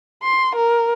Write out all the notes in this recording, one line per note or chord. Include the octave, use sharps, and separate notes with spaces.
C6
A#4